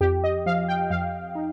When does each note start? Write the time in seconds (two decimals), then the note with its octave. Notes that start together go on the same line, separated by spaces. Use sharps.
0.01 F2 G4
0.24 D#5
0.46 F3 F5
0.68 G5
0.90 F2 F5
1.35 D#4